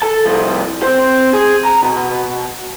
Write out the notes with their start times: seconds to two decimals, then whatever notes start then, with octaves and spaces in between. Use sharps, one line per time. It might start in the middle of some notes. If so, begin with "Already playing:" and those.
0.02 A4 A5
0.25 C2 F3
0.83 C4 C5
1.33 G#4
1.65 A#5
1.83 B2